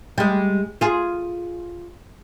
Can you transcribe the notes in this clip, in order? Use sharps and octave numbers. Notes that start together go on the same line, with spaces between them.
G3 G#3
F4 G#4